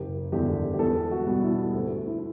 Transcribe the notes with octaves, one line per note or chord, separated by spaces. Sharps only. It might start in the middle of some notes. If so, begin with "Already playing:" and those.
Already playing: F#1 G4
E2 D3 G4
G4
E2 A4
F#4
B2 G3 B3
E4
D2
E4